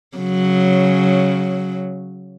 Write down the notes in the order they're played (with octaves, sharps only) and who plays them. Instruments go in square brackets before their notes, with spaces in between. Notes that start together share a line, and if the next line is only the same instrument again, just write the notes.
[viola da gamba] C#3 F#3